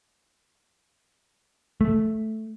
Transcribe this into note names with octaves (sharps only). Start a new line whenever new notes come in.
A3